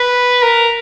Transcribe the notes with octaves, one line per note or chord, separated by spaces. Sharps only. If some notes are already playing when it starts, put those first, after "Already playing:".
Already playing: B4
A#4